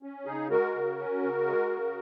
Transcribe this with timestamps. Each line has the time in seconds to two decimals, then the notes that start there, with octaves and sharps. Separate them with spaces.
0.03 C#4
0.26 C#3 D#4 G#4
0.50 G#3 F#4 A#4
0.75 C#3
0.99 C#4
1.23 C#3
1.47 G#3
1.72 C#3